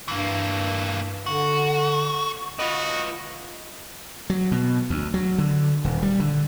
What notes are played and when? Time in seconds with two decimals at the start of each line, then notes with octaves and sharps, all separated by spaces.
0.08 G2 E3 A#3
1.26 D3 F#4
2.59 F4 F#4 B4 D#5
4.30 F#3
4.52 B2
4.90 D2
5.14 F#3
5.38 D3
5.84 D#1
6.03 G3
6.20 D3